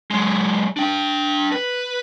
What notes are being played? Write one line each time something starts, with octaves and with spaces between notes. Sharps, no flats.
F#3 G#3
D4 G5
B4